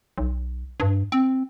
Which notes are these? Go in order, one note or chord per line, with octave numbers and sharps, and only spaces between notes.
B1
G2
C4